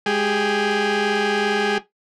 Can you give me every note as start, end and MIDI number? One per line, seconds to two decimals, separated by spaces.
0.06 1.78 56
0.06 1.78 67
0.06 1.78 68